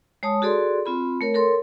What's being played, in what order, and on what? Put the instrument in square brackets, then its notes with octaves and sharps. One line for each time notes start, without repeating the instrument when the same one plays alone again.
[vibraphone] G#3 C#5 A5 D#6
F#4 G#4 A4 D5 C6
C4 F4 B5
A3 A#4 C#5
A4 A#4 C#5 C6